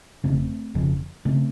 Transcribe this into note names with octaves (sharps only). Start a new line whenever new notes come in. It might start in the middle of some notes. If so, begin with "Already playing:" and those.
F1 F2 C#3 A3 C4
F1 F2 C#3
C#3 A3 C4